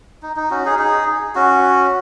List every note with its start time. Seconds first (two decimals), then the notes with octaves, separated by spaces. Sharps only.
0.23 D#4
0.36 D#4
0.51 C#4 F#4
0.65 D#4 G#4
0.79 D#4 G#4
1.35 C#4 F#4